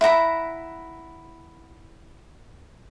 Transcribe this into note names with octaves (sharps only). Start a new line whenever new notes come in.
E4 F#5 A#5 B5